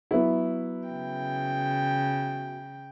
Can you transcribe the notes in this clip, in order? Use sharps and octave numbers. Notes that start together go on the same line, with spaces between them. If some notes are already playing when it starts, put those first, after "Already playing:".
F#3 B3 E4
C#3 G5